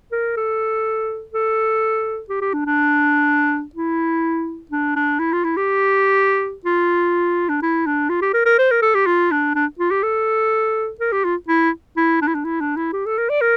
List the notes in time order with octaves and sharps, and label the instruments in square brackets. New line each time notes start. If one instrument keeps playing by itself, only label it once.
[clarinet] A#4
A4
A4
G4
G4
D4
D4
E4
D4
D4
E4
F4
E4
G4
F4
D4
E4
D4
F4
G4
A#4
A#4
C5
A#4
A4
G4
F4
D4
D4
F4
G4
A4
A#4
G4
F4
E4
E4
D4
E4
D4
E4
D4
E4
G4
A4
A#4
D5
A#4